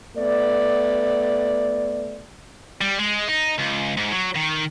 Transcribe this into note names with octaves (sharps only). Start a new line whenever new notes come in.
A3 B3 D5
G3
G#3
D#4
C#2
G#2
F#3
D#3